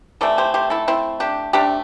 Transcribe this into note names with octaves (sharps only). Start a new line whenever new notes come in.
C3 E3 A3 A4 D5
G4 C5
G4 C5
E4 A4
C4 E4
D4 G4
C3 A3 D4 G4